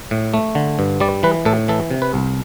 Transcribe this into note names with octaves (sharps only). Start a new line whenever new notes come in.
A2
A3
D3
G2
G3 D5
E3 B4
A2 A4
E3 A4
C3
B4
C2